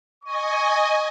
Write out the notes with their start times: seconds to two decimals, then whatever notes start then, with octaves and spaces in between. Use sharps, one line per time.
0.24 D#5 G#5 C#6